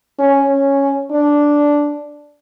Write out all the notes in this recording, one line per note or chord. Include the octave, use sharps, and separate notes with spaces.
C#4
C#4
D4